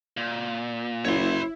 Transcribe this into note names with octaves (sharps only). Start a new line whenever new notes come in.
A#2
F#1 E4 C#5 C6